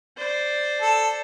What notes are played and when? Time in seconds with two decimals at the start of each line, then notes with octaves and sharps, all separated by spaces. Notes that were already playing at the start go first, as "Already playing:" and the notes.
0.17 C5 D5
0.81 A4